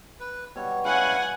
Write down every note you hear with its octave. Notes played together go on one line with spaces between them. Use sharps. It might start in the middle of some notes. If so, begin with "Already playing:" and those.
B4
B2 G3 F#4 C#5
C#4 E4 F5 F#5 G#5